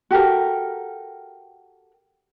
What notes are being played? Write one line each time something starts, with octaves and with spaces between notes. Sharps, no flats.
F#4 G4 A4 A#4